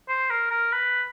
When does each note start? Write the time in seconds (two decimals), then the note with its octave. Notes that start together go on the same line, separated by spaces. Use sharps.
0.09 C5
0.30 A#4
0.51 A#4
0.73 B4